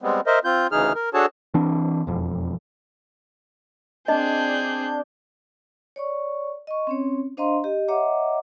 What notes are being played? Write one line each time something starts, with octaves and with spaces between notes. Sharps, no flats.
G3 G#3 B3 C4
A#4 C5 D#5 E5
C4 F4 G6
D2 C#3 E3 D#4 G#4 F6
A#4
D4 F#4 G#4 A4 C#5 A5
E3 C4 D4
E1 F2
C4 D4 G#4 D#5 G6
C#5 D5 C#6
D#5 C#6
C4 C#4 C#5
D4 C5 D#5 F5 A#5 C6
G4 D#5
C#5 D#5 E5 F#5 A#5 D6